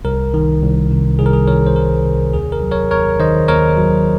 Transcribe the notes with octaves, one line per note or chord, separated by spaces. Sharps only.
C2 A#4
D#3
C2
C3
C2 G#4
A#4
G#4
D#3 A#4 C#5
C5
C2 A#4
C3
D#2 G#4
A#4
F#3
A#4 C#5
D#2 A#4 C#5
D#3 C5 D#5
D#2 A#4 C#5
F#3